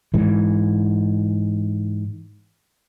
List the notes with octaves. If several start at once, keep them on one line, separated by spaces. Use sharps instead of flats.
G#2 E3